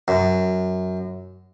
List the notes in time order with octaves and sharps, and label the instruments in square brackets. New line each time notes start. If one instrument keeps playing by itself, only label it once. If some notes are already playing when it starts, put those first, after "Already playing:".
[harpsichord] F#2